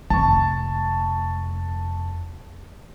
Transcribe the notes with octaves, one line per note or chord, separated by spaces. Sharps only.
F1 A5 C#6